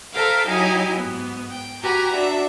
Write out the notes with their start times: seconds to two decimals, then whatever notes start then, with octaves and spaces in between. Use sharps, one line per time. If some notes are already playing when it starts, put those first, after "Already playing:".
0.13 A4 A#4 C5 E5 F5 G5
0.47 F#3 D#4 E4 G4 D#5 G#5
0.97 G#2 B3
1.51 G5
1.82 F#4 G4 B4 G#5 A#5
2.13 D4 F#4 E5